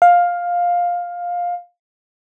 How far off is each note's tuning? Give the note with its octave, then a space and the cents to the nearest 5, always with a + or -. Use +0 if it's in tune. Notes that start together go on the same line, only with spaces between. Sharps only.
F5 +10